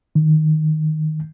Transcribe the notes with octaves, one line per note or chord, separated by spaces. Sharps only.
D#3